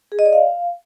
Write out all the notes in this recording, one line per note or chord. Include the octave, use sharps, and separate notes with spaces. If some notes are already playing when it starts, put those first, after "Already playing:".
G#4
D#5
D5
F5